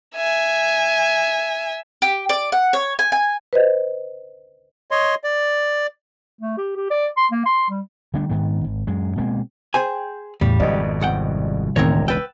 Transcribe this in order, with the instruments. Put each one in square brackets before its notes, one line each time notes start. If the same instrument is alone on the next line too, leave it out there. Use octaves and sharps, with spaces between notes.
[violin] E5 G#5
[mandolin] G4
D5
F#5
C#5
G#5
G#5
[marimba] B4 C5 D#5
[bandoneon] C#5 D#5 C6
D5
[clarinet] A3
G4
G4
D5
C6
A#3
C6
G3
[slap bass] D3 G3 A3 D4
G#2 D#3 B3
G#1
F#2 G#3
B2 G#3 A#3 C4
[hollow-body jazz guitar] G#4 C5 G#5 [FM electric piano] G5
[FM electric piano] E2 A2 [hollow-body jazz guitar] C#3 G3
[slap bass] G#1 F2 B2 [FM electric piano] D5 D#5
[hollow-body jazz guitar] C2 F#5 G5
[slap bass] E1 C#2 [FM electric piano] A2 D#3 [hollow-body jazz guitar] C4 A#4 C#5
[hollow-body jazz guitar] B4 G5 [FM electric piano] E6 A6